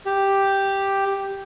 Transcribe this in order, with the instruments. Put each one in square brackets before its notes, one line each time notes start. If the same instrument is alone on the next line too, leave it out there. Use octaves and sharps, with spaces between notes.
[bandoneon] G4